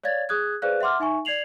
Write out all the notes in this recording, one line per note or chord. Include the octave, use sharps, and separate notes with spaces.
C#5 D5 F5 G#6 A6
G#4 D#6 F#6 G#6
G#4 B4 C5 D5 F5 F#6
E5 F#5 C6 D6 F6
D#4 E5 G#5 C#6
D5 G#6 C7 F7 F#7